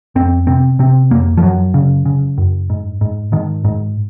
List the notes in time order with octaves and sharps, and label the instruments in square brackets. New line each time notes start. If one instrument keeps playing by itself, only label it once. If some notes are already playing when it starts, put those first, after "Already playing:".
[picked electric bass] F2 C4
C3 C4
C3 C4
F2 A#3
F3
F#2 F#3
C#3
C#3
F#2
G#2
G#2
G#2 D#3
G#2